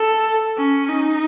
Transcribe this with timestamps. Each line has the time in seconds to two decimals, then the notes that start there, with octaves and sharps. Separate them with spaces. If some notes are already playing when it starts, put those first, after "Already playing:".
Already playing: A4
0.57 C#4
0.89 D#4